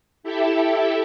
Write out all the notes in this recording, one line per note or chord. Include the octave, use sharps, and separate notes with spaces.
E4 G4 A4 E5